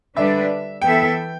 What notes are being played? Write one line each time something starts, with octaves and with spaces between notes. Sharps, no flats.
D3 G3 D4 B4 D5 E5
E3 B3 E4 A4 E5 G5